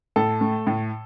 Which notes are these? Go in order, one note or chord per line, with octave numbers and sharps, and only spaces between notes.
A2 A4
A3
A2